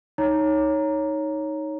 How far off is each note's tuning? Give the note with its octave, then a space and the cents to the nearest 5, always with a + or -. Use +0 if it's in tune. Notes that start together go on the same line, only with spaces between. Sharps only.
D#4 +0 C#5 +0 A#5 +0